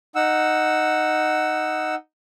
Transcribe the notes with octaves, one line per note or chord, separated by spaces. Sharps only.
D#4 F#5 E6